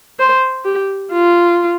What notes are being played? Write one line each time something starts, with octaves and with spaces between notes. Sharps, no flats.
C5
G4
F4